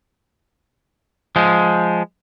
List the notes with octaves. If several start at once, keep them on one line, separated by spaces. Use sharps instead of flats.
F3 G#3